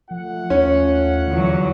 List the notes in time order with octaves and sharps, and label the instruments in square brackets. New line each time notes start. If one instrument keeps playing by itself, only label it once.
[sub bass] F3 [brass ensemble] A3 F4 F#5
[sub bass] D#2 [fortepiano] C#4
[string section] E2 F#3 [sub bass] D3